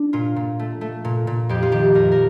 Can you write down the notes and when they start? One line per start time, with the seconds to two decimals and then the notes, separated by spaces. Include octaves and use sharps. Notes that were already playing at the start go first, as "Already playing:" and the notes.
Already playing: D4
0.13 A#2 F4
0.36 A#2
0.59 A3
0.81 A3
1.05 A#2
1.27 A#2
1.49 F2 G4
1.62 F4
1.72 D#3 G4
1.95 F2 A#4
2.12 A#4